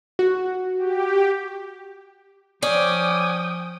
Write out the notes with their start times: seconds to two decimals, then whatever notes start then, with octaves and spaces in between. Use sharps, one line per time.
0.19 F#4
0.78 G4
2.63 F3 C#4 D5 G5 D#6